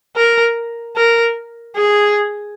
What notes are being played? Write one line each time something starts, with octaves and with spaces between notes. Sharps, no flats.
A#4
A#4
G#4